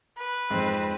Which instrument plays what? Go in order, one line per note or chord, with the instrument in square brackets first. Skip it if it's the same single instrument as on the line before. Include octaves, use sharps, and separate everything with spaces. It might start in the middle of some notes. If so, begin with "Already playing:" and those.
[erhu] B4
[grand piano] F2 G#2 [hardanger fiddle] C4